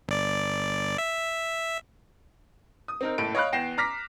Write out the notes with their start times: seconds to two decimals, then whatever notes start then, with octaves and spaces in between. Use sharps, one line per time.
0.08 G1 D5
0.98 E5
2.88 D#6
3.01 C4 D#4 A#4
3.18 F#1 A2 A4 D7
3.35 C#5 D#5 F5 B5 F#6
3.52 E2 G5 A#6 C7 E7
3.78 A#5 D6 F6 A#6 B6